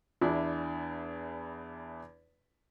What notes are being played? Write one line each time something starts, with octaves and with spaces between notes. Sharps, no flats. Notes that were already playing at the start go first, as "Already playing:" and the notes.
E2 D4 E4